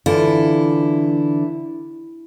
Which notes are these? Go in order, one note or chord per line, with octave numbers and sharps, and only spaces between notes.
D3 E3 E4 F4